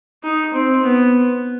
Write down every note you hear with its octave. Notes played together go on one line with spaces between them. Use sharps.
D#4
C4
B3